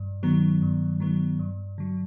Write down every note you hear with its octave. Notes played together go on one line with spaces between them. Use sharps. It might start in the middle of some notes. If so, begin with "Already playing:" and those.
Already playing: G2
D#3 F#3 B3
G2
D#3 F#3 B3
G2
D3 F#3